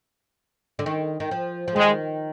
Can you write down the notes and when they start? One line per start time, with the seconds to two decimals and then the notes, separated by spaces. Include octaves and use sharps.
0.79 D3
0.86 D#3
1.20 D#3
1.31 F3
1.68 F3
1.75 D#3 G#3